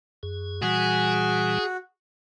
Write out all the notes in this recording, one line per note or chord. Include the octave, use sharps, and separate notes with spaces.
F#2 G#4
A#2 E3 G3 F#4 G#4